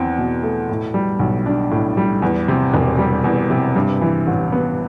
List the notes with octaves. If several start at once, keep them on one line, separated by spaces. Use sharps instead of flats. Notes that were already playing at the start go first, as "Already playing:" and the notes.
Already playing: E2 C4
B2
A3
A2
G3
B1
D4
A2
G3
E2
C3
E1
G3
E2
C3
G2
E3
A1
B3